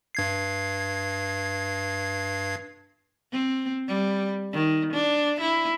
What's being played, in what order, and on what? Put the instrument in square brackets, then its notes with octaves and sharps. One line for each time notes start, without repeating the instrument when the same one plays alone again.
[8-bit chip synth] G2 G#6 C7
[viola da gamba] C4
G3
D#3
D4
E4